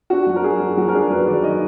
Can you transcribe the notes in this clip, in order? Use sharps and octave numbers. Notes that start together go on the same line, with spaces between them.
D4 F#4
F#3
A#4
D4 G#4
F#3
F#3 F#4
A#4
D4 G#4
F#3 B4
D#3 D5
D#3 D#5